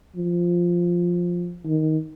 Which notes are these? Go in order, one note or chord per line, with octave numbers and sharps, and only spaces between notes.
F3
D#3